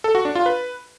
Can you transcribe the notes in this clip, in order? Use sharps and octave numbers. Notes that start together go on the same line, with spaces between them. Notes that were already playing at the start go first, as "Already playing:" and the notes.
A4
F#4
D4
F4
B4